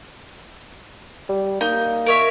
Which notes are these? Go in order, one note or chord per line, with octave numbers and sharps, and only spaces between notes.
G3
A#3 D#4
A#4 C#5 E5